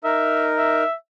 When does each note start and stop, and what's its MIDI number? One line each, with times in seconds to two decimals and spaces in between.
0.04 0.83 63
0.04 0.83 70
0.04 0.52 76
0.58 0.94 76